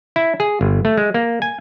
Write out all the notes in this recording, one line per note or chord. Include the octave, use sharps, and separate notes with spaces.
E4
G#4
G1
A3
G#3
A#3
G#5